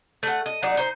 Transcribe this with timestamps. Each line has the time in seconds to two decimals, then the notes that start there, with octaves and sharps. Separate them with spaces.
0.23 A3 F#5
0.46 D#5
0.63 F#3 D#4 D5 A#5
0.77 D#4 C5